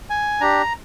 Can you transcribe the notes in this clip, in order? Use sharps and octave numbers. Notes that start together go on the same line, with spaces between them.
G#5
D4 G4 A#5